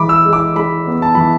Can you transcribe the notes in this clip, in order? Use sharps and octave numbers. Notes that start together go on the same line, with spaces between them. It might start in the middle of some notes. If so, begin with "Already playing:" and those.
Already playing: E3 G#3 B5 D6
E6
G#3
D6
G#3 B5
B3
A5
E3 B5